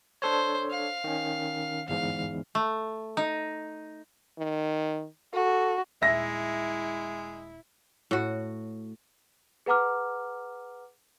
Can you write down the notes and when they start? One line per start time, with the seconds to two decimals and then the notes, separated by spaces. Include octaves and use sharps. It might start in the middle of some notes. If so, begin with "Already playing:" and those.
0.22 D4 A4 C5 C#5
0.71 F5
1.04 D#3 C#4
1.88 G1 E2 G#2 F5
2.55 A3
3.17 D#4
4.39 D#3
5.34 F#4 A4
6.02 D#1 G#3 E4 E5 A#6
8.11 A2 F#4
9.66 G#4 B4 F#5 A#5 D6 F6